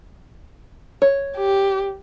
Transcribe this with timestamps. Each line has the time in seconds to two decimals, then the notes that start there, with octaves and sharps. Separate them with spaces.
1.02 C#5
1.37 G4